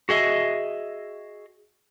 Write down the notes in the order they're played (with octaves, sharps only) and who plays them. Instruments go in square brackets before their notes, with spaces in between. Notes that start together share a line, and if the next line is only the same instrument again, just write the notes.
[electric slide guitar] F#4 G#4 D#5 E5